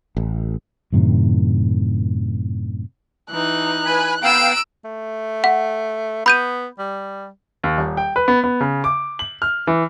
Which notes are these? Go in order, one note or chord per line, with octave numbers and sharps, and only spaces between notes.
A1
F#2 A2 C3 D#3
E3 D#4 F#6
B4 G#5 B5
B3 F5 G5 A#5 E6 D7
A3
F#5
B3 B5 G6 D#7
G3
D#2
D#1
G5
B4
B3
B3
C#3
D6
F#7
F6
E3